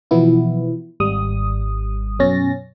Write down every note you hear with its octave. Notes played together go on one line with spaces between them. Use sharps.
B2 E3 F3 B3 E4
G#1 G3 D#6
F#2 B2 C#4 A6 A#6